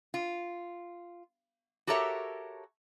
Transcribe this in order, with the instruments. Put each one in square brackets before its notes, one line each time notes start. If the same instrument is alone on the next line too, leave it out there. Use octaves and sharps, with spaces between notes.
[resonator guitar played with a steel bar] F4
F#4 G4 A4 A#4 C#5 E5